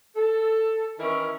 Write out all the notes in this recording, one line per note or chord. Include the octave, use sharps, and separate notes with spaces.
A4
D#3 E3 C#4 E4 A#4